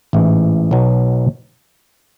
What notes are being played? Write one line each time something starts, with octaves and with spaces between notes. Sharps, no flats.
A1 G#2 E3
B1 B2 F#3